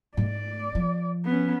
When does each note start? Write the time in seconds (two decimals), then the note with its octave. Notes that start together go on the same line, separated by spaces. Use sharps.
0.17 G#2 A3 D5
0.75 F3
1.25 B3 C#4